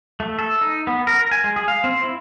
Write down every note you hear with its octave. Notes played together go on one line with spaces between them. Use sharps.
A3
A4
D#4
B3
A#4
A#4
G#5
G#3
G#4
F5
C4
E4